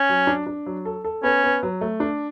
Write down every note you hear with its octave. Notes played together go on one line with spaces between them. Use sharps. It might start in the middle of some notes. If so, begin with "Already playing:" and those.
Already playing: C#4
F#3
D4
D4
F#3
A4
A4
B3 C#4
B3
F#3
A3
D4